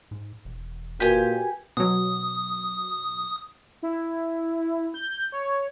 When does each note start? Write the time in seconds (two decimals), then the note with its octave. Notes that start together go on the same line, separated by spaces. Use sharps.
0.11 G#2
0.45 E1
1.00 A#2 F#4 G4 A#4 B4 G#5
1.77 B2 F#3 D#6
3.83 E4
4.94 G6
5.32 C#5